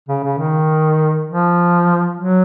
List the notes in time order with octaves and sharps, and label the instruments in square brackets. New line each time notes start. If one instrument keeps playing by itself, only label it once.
[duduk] C#3
C#3
D#3
F3
F#3